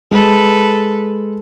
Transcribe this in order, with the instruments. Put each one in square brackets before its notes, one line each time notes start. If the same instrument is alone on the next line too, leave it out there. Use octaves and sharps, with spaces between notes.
[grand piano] G#3 [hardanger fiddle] A4 B4